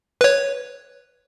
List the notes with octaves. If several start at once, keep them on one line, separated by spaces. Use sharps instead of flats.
B4 C#5